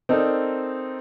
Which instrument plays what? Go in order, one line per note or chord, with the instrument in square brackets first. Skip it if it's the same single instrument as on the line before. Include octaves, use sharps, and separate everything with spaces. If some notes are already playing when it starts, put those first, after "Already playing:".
[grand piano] C4 D#4 A4 A#4 D5